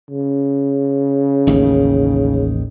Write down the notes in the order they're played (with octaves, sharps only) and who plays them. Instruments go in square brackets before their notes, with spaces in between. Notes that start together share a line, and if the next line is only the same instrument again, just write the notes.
[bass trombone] C#3
[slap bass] A1 D#2 D#3